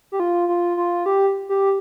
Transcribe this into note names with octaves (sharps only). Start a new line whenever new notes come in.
G4
F4
F4
F4
G4
G4